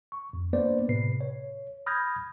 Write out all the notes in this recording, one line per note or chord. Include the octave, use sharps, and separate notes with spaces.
C#6
F2
A#3 B3 D4 B4 C5 D5
A2 C3 B4 C7
C#5
B5 D#6 F6 G6 G#6 A#6